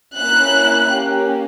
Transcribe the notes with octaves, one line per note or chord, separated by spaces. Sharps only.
A#3 C#4 E4 F#6
A#3 C#4 G4